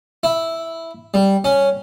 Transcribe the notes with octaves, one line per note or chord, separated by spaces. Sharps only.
E4
G3
C#4